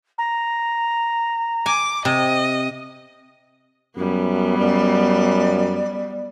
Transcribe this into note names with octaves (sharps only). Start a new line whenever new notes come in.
A#5
G#5 D6
C3 D#5
F#2 G3 B3
F#2 D5